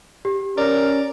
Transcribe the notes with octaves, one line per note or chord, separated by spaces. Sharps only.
G4
C#4 A#4 D5